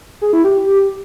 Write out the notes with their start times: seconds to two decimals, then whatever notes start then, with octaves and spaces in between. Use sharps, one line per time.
0.21 G#4
0.33 E4
0.44 G4